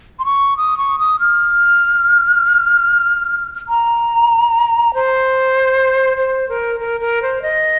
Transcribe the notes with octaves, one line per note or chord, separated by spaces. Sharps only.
C6
C#6
D#6
C#6
D#6
F6
A#5
C5
C5
A#4
A#4
A#4
C5
D#5